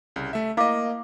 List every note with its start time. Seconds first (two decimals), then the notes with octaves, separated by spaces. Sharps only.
0.16 C2 C#3
0.33 A3 E5
0.57 A#3 E4 D#5 F5 D6